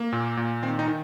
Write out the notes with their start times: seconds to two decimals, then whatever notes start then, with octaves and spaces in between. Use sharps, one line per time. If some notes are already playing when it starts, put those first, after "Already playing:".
Already playing: A#3
0.12 A#2
0.37 A#2
0.63 D#3 C4
0.79 D#4
0.88 D#3